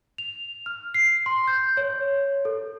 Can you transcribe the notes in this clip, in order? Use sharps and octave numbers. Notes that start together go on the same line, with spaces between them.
F7
F6
C7
C6
G6
C#5
A4